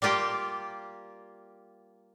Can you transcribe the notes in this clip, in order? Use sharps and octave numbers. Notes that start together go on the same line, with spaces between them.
G3 A#3 F4 G4 G5